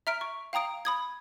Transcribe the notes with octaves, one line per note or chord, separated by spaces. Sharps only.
E5 A#5 F6 B6 D7
C#6
F5 G5 A#5 D#6 D7
B5 D#6 G#6